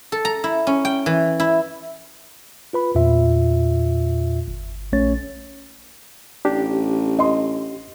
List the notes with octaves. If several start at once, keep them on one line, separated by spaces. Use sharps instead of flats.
A4
A#5
E4
C#4
G5
E3
E4
F4 B4 B5
E2 A#2 F4 E5
G1
A#1 A3 C#4 C#5 A6
A1 D4 G4
D#5 C6